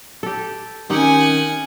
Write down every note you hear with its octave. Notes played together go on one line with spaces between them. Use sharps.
G4 A4
D#3 C4 C#4 D#4 G4 F#5 G#5